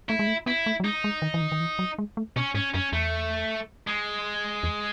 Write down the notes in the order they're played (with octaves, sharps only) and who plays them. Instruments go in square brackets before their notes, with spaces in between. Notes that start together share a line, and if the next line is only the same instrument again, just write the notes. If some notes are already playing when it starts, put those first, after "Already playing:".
[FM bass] A3 [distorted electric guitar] E4
[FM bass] G#3
A3
[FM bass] B3 [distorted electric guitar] E4
[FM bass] A3
F#3
[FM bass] G#3 [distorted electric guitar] D#4
[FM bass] G#3
D#3
E3
D#3
D#3
E3
F#3
G#3
A3
[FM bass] B2 [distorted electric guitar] C#4
[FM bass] G#2 [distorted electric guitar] C#4
[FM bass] F#2 [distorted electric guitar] C#4
[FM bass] E2 [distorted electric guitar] A3
[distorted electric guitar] G#3
[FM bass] E2